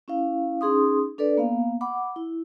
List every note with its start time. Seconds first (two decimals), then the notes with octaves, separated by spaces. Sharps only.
0.08 C#4 E4 F5
0.61 C#4 D#4 G#4 C6 D#6
1.18 D4 A4 B4 D5
1.37 A#3 B3 F5
1.81 F#5 B5 D6
2.16 E4